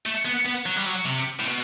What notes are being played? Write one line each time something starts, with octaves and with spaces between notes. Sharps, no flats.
A3
B3
B3
F#3
G3
F#3
C3
A2
B2